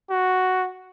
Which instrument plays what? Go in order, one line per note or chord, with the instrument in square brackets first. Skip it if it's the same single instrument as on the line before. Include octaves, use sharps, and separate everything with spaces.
[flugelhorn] F#4